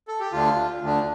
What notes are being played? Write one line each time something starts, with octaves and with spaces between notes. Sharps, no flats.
A4
G4
D2 D3 A3 D4 F4
D2 D3 A3 D4